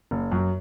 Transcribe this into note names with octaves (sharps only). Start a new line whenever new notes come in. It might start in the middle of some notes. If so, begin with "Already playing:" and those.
F#1
F#2 F#3